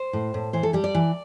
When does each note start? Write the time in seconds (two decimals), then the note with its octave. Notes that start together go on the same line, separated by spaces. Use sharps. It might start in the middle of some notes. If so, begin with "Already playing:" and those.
Already playing: C5
0.13 A2
0.34 A2
0.53 E3 C5
0.63 A4
0.73 G3 G4
0.84 D5
0.95 E3